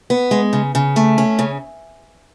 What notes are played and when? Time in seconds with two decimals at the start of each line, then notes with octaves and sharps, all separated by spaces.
0.10 B3
0.31 G#3
0.53 C#3
0.75 C#3
0.96 A3
1.18 C#4
1.39 C#3